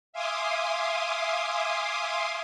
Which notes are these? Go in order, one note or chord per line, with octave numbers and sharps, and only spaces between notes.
E5 F5 G#5 C6 D6 D#6